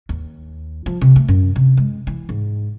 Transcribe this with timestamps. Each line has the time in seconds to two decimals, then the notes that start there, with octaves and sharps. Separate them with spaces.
0.09 D#2
0.86 F3
1.01 C3
1.16 A3
1.28 F#2
1.56 C3
1.77 G#3
2.07 E3
2.29 G#2